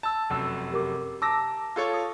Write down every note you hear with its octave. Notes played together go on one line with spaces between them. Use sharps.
A5 E6
F1 F#2 E6
G4 A#4 D6
A5 A#5 D6 E6 A#6
F4 A4 C#5
D#6